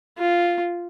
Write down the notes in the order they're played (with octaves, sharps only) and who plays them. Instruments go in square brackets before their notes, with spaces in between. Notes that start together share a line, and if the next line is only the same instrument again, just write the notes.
[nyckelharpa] F4